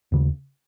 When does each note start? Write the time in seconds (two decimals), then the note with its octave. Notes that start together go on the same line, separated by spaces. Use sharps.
0.12 D#2 C#3